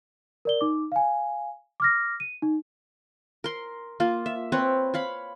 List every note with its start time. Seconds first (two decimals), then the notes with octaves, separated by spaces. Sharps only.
0.45 A#4 D5 G7
0.61 D#4 D6
0.92 F5 G#5
1.80 D6 F6 A#6
2.20 D#7
2.42 D#4
3.44 A#4 C6
4.00 A#3 F4
4.26 E5
4.52 C4 B4 C#5
4.94 C#5 F5 B5